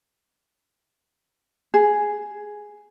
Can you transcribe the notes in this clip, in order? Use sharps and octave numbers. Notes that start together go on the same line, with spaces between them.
G#4